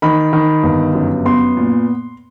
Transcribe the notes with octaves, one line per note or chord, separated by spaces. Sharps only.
D#3 B5
D#3
G1
F#2
B3 C6
A#2